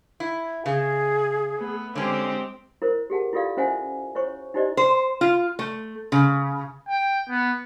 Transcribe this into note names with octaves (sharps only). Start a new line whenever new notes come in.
E4
C#3 G#4
A3 B3
D3 G#3 C4 C#4 G4
E4 A#4 C5
G4 G#4 F#5 A5
E4 F4 G4 A4 D5 F5
C#4 E4 C5 E5 F#5 G#5
E4 C5 C#5 C#6
D#4 E4 G4 C5 D5 D#5
C5
F4
A3
C#3
G5
B3